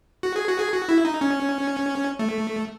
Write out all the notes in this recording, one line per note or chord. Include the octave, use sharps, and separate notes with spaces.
F#4
G#4
F#4
G#4
F#4
E4
D#4
C#4
A3